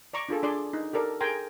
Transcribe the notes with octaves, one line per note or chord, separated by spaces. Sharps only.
D5 A#5 C#6 D6
D4 F4 G#4 A4
D4 G#4 D5 C6
D#4
G4 A4 A#4 D5
G#4 A#4 G5 G#5 A#5 C6